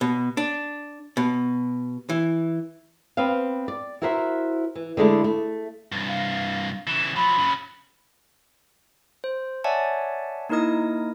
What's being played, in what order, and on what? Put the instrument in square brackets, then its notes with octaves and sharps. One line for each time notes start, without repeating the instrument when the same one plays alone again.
[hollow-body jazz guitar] B2
D4
B2
E3
[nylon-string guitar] B3 C4 C5 F5
D5
E4 F#4 A#4 C5 C#5 E5
E3
D3 G#3 A3 E4
A3
[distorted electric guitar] C2 G2
[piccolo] F5
[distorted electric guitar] C#3 E3 [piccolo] E7
[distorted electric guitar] F3 F#3 [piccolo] B5
[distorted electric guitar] C#3 F#3
[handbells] C5
C#5 D5 E5 F#5 G#5 A5
A#3 D#4 E4 A#4 D#5 D#6